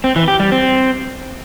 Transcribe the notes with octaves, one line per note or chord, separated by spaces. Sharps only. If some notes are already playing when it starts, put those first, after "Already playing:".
C4
E3
G4
G3
C4